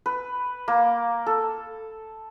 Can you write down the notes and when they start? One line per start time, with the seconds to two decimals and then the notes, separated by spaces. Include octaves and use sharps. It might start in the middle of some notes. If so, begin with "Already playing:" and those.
0.06 B4
0.68 A#3
1.26 A4